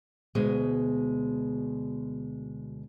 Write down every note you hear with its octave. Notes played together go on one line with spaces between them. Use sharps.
D2 B2 G#3